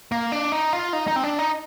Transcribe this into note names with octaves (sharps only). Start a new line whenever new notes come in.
A#3
D4
D#4
F4
D#4
D#4
C4
D4
D#4